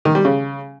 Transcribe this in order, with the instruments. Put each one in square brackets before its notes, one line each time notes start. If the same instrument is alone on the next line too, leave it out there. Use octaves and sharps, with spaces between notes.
[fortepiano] D#3
G3
C#3